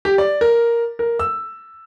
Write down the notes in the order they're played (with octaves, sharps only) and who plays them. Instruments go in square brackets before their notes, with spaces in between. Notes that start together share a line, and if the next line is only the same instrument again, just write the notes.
[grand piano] G4
D5
A#4
A#4
E6